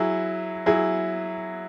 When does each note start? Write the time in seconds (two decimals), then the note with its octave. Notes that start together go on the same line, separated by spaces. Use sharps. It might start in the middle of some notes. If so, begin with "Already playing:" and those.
Already playing: F#3 E4 G#4
0.66 F#3 E4 G#4